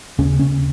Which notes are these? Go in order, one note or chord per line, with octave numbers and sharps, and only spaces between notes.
D#2 C#3 C#4
C#4